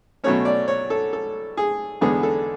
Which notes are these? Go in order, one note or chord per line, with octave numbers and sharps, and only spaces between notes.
B2 F#3 A3 C#4 C#5
D5
C#5
A4
A4
G#4
E2 D3 G#3 B3 G#4
A4